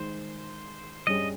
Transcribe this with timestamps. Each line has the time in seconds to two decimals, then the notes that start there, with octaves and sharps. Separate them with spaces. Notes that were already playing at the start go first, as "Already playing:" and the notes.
Already playing: D#3 G#3 C5
1.07 G2 G3 C#4 G#4 D#5